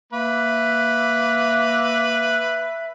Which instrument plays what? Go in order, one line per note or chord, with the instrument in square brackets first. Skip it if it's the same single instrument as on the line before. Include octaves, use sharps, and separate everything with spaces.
[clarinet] A#3 [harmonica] B4 [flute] E5